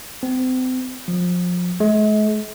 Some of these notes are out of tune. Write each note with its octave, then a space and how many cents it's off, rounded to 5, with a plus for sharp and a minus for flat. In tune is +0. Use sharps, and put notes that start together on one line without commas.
C4 -35
F3 +25
G#3 +45